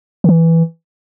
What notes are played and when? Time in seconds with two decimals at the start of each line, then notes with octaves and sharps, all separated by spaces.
0.24 D#3
0.29 E3